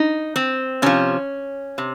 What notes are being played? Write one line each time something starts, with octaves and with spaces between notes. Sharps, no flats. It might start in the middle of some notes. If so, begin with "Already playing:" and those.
Already playing: D#4
C4
C3 F3 C#4
C3